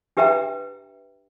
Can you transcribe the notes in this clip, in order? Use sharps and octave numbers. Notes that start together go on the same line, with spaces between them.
D4 G4 B4 E5 G5 A#5